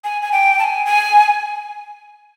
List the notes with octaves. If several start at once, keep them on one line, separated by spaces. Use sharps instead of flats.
G#5
G#5
G5
A5
G#5
G#5